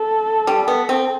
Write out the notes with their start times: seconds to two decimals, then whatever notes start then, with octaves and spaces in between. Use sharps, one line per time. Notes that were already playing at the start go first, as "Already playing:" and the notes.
Already playing: A4
0.47 G3
0.68 B3
0.89 C4